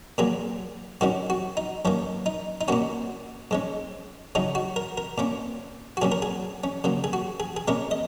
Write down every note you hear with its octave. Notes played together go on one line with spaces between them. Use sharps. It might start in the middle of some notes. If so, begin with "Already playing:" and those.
A#2 F#3 A#3 G#4
G#2 D#3 F#3 C#4 F#4
F#4
D#4
F#2 D#3 A#3 C#4
D#4
D#4
A#2 A#3 C#4 F#4
G#2 G#3 C#4
C#3 F#3 C#4 D#4
F#4
A#4
A#4
A#2 A#3 C#4
F#4
A#2 F#3 C#4 G#4
A#4
G#4
C#4
C#3 F#3 A#3
G#4
F#4
G#4
G#4
A#2 G#3 C#4 A#4
D#5